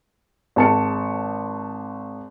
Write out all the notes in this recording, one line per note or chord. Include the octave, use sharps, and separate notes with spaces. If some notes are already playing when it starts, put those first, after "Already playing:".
G#1 A5 C#7